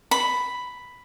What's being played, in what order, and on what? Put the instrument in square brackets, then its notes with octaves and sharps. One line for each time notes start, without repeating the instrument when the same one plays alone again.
[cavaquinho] B5